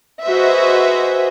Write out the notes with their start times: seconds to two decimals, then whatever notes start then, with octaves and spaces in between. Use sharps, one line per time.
0.25 F#4 G#4 B4 C5 D#5 E5